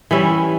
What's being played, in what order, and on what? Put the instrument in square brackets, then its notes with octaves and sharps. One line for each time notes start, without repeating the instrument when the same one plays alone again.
[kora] E3 G3 C#4 E4